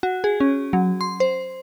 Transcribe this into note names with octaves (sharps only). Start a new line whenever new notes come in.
F#4
G#4
C#4
F#3
C6
C5